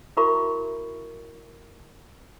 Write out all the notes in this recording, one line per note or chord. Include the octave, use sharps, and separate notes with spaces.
E4 F#4 A#4 E5 B5 C#6